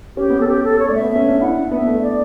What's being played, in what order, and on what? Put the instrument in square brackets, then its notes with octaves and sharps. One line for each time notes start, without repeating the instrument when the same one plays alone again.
[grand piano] C#4 [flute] G4
[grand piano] B3
[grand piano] C#4 [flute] A4
[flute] G4
A4
C#5
[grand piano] A3 [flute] D5
[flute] E5
[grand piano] B3
C#4
D4
[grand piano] E4 [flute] F#5
[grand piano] D4
[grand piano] B3 [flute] E5
[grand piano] A3
[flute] D5